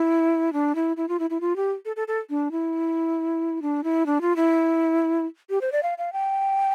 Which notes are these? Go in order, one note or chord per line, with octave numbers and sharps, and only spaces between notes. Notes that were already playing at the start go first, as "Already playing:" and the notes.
Already playing: E4
D4
E4
E4
F4
E4
E4
F4
G4
A4
A4
A4
D4
E4
D4
E4
D4
F4
E4
G4
C5
D5
F5
F5
G5